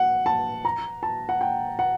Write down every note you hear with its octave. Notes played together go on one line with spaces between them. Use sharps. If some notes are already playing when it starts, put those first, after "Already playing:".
Already playing: F#5
A5
A#5
A5
F#5
G5
F#5